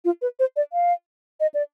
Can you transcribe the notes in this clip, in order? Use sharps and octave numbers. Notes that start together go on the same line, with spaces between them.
F4
B4
C5
D5
F5
D#5
D5